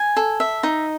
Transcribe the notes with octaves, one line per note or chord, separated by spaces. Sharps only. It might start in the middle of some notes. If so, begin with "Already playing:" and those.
Already playing: G#5
A4
E5
D#4